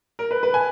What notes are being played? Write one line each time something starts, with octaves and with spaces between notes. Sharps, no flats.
A#4
B4
B4
G#5